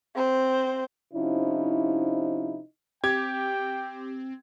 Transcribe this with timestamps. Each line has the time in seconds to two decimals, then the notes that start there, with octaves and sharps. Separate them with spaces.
0.15 C4 C5
1.13 C3 F3 C#4 D#4 E4
3.04 C4 G4 G5 G#6